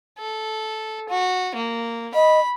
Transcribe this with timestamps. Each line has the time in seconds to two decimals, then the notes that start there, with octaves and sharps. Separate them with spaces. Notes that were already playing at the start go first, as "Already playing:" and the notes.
0.18 A4
1.10 F#4
1.55 A#3
2.15 D#5 B5